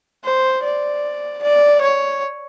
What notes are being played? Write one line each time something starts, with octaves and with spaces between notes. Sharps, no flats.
C5
D5
D5
C#5